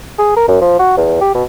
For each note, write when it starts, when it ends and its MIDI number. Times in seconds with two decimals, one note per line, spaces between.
0.19 0.36 68
0.36 0.46 70
0.48 0.58 42
0.61 0.77 53
0.79 0.95 66
0.97 1.17 40
1.21 1.34 67
1.35 1.43 47